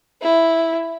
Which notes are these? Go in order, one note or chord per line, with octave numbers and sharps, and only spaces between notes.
E4